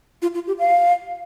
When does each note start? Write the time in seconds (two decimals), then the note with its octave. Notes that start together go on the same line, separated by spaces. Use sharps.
0.22 F4
0.34 F4
0.47 G4
0.59 F5